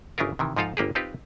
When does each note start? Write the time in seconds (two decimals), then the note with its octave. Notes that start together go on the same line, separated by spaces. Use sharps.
0.18 G1 C#3 D4 E4 F4 A#4
0.39 C3 D#3 E3
0.56 G#2 F3 D#4 F4 A4 F5
0.77 G1 A#3 G4 G#4
0.95 C4 D#4 F4 G4 B4